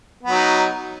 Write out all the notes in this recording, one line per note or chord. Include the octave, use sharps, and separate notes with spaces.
F#3 B3 D#4